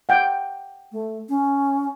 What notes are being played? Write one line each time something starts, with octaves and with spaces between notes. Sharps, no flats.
F#5 G5
A3
C#4